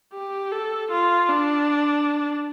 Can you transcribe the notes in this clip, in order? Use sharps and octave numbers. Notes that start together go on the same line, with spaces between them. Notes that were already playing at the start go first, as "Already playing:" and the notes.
G4
A4
F4
D4